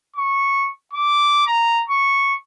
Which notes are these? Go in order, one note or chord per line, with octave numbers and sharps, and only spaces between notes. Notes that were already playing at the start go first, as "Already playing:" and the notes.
C#6
D6
A#5
C#6